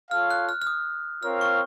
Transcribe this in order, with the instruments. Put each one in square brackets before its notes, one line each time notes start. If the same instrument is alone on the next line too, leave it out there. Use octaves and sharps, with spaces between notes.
[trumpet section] F4 A4 C#5 F5 [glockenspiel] F6
[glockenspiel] F#6
F6
F6
D#6
[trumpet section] C4 F4 A#4 C#5 F5 [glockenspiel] F6
[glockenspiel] C#6